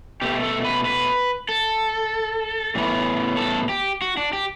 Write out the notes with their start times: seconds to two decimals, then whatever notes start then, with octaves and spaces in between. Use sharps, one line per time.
0.21 B2 A3 G4
0.43 A4
0.64 B4
0.85 B4
1.49 A4
2.75 A2 E3 B3
3.37 A4
3.69 G4
4.02 F#4
4.17 D4
4.33 G4